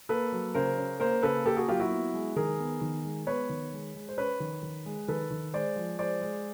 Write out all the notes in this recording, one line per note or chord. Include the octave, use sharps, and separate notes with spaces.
A#3 A4 B4
F#3
C#3 A#4 C5
C#4
A#3 A#4 C5
C#3 A4 B4
A#3 G4 A4
F#4 G#4
F#3 F4 G4
E4 F#4
B3
G#3
D#3 G#4 A#4
B3
D#3
G#3
B3 B4 C#5
D#3
G#3
G#3
C5
C#4 B4 C#5
D#3
D#3
G#3
D#3 A4 B4
D#3
G#3 C5 D5
F3
G#3 C5 D5
G#3